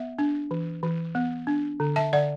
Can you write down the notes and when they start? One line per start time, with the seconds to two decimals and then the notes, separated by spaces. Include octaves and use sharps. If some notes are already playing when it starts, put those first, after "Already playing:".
Already playing: B3 E5
0.19 D4
0.51 E3
0.83 E3
1.15 B3
1.47 D4
1.80 D3
1.96 E5 A5
2.12 D3 D5 F#5